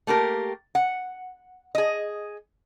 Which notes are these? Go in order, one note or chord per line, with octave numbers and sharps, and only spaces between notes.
A3 A#3 G4 A#4
F#5
G#4 D#5